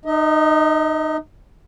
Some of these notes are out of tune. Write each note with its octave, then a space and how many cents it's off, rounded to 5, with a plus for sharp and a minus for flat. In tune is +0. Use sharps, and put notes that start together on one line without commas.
D#4 -25 D#5 +35